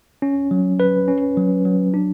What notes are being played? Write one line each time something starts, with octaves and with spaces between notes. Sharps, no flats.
C#4
F#3
B4
C#4
F#3
F#3
D4